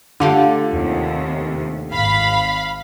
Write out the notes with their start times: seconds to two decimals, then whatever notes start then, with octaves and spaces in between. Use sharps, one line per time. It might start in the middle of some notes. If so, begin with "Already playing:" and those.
0.20 D3 A3 F4 G4
0.72 D#2 C3
1.91 G#1 F5 B5